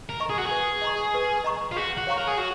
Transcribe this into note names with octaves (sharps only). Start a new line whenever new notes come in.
A#4
D#5 A#5 C#6
G#4
F#4
G#4 B4
D#5 A#5 C#6
B4
D#5 A#5 C#6
F4
F#4 G#4
F#4
C#5 F5 A#5 C#6
A#4
G#4
F#4 G#4